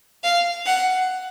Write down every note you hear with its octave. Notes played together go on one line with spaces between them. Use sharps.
F5
F#5